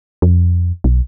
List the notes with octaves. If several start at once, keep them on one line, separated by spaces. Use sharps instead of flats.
F2
B1